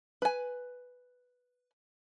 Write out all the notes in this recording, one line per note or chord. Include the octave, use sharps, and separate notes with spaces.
B4 G#5